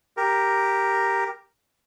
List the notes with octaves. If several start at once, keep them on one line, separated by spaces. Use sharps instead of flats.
G4 A#4